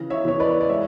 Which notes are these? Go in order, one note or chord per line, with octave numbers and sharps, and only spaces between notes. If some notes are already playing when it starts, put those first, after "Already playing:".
Already playing: C#3 E3
C#5 E5
E3 C#5
B4 D5
D5
G#3 C#5 E5